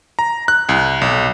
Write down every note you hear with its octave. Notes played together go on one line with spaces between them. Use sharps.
A#5
F#6
C2
B1